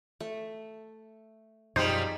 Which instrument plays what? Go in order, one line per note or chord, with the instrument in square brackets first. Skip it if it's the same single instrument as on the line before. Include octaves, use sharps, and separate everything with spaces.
[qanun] A3
[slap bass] F#2 B2 [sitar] F3 G3 [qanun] D#4 G#4 [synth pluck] C5